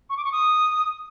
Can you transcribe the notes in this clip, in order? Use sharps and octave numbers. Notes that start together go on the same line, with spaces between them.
C#6
D6
C#6
D#6